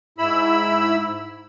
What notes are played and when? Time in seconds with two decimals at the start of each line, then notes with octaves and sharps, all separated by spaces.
0.18 G#2 E4 B5 E6